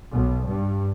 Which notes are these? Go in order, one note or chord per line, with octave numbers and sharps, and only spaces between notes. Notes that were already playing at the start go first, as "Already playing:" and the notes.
B1
G2